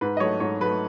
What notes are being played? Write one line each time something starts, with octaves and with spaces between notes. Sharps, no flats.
G#2 B4
D#5
F#3 A3 C#5
G#2 C#5
F#3 A3 B4